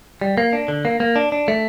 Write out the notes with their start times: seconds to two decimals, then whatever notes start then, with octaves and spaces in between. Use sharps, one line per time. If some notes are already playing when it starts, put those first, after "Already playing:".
0.21 G3
0.38 A#3
0.53 D4
0.68 D3
0.85 A#3
1.00 A#3
1.16 D4
1.32 D4
1.48 A3